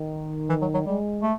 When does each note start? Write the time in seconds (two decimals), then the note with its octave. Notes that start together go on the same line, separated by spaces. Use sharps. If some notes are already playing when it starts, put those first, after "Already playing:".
Already playing: D#3
0.49 E3
0.62 F#3
0.74 F#3
0.86 G3 G#3
1.23 A3